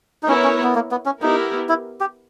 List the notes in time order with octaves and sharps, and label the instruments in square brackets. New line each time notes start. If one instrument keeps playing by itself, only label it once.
[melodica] D#4
[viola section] B3 E4 A#4 C#5 [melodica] C#4
[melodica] C#4
B3
A#3
B3
C#4
[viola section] B3 E4 G4 A#4 [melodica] D#4
[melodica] E4
G4